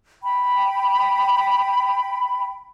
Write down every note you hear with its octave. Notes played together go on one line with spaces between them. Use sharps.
G5 B5